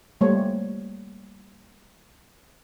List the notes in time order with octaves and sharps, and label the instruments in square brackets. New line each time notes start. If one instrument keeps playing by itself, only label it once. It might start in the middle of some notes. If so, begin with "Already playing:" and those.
[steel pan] G3 A3 A#3 C5 C#5